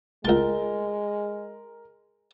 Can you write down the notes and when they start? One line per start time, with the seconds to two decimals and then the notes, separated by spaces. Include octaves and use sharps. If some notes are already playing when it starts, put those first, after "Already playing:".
0.25 C#2 G#3 A#4 A5 G7